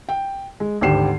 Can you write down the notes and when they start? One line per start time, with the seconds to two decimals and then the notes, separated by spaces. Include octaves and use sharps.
0.09 G5
0.60 G#3
0.81 G#1 D2 G4 C7 E7